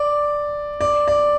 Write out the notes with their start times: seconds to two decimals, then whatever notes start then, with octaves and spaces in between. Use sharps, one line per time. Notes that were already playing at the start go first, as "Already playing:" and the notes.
Already playing: D5
0.81 D5
1.08 D5